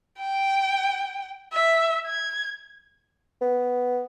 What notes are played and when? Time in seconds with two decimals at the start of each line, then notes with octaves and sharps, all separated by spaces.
0.19 G5
1.53 E5
2.06 G#6
3.41 B3